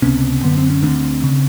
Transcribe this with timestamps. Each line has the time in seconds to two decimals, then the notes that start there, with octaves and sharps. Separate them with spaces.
0.02 C#2 C3 B3 C#4
0.43 F#2 D3 B3
0.58 C4
0.70 C#4
0.83 D2 D3 C4 D4
1.24 C#3